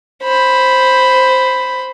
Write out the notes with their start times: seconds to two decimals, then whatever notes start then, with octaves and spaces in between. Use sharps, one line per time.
0.23 C5 B5